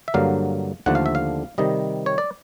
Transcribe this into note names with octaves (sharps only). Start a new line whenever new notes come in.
E5
G2 D3 F#3 A#3 F5
D#2 D3 F3 A3 D4 F#5
F5
E5
F5
C3 D#3 G3 D#5
C#5
D5